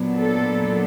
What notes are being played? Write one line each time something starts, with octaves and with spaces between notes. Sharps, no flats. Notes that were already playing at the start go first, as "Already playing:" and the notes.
Already playing: A#2 F#3 B3 D4
A4